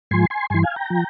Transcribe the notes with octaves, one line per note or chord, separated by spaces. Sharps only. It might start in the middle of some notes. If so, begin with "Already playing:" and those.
G#2 F3 G#5 C6
G#5 C6
G2 E3 G#5 C6
F5 G#5
G5 A#5
F3